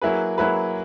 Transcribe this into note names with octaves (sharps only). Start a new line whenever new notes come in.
F#3 A#3 E4 G#4 B4
F#3 A#3 E4 G#4 B4